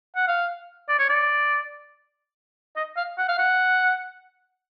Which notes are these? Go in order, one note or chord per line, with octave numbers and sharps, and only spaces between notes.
F#5
F5
D5
C#5
D5
D#5
F5
F#5
F5
F#5